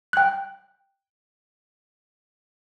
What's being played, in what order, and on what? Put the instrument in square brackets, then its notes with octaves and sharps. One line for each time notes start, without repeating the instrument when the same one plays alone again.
[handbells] G5 F#6